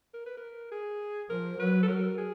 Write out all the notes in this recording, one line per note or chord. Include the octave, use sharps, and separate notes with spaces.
A#4
B4
A#4
G#4
F3 A#4
F#3 B4
A4
A#4
G#4